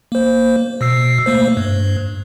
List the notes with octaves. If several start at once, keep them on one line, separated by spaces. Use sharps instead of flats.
A#3 C5
B2 E6 C7
A3 A#3 C5
G2